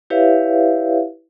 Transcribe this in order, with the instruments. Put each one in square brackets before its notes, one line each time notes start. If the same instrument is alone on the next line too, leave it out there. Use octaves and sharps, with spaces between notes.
[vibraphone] E4 G4 B4 C#5 E5 F5